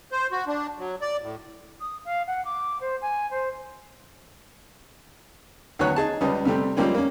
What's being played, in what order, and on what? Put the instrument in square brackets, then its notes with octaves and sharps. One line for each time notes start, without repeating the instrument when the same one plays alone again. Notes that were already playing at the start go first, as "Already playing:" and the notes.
[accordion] C5
F#4
D4
F#3
D5
A2
[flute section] D#6
F5
F#5
D6
C5
G#5
C5
[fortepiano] D2 D#3 F#3 B3 C#5 F#6
D#4 G#4 A5
C#2 G3 C#4 B4 D#5
C3 G3 A3 C4
F3 G3 G#3 A#3 C4 C#4
A#3 C#4